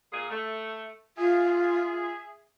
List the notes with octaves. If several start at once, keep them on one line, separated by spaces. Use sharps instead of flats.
A#2 G#4
A3
F4 G#4 E5